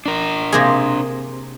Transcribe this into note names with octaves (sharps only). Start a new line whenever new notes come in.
D4 A#4
C3 A#3 G#4